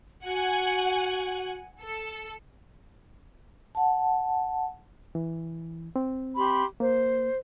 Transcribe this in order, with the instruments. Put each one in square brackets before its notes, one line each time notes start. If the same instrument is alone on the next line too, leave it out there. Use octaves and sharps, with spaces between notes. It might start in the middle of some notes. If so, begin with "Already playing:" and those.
[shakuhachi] F#4 [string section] F#5 G#5
[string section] A4
[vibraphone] F#5 A5
[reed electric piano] E3
C4
[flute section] G4 B5 C6
[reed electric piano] A#3 [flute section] C5